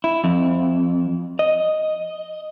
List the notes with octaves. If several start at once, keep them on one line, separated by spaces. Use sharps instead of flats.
E4
F2
D#5